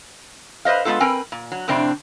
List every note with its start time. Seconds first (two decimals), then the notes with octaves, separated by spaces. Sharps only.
0.65 B4 C5 D#5 F5
0.85 G#3 A#3 B3 F4 A4
1.00 C4 A#4 B4 G5 G#5
1.32 A#2
1.52 F#3
1.68 F2 A2 C3 C4 D4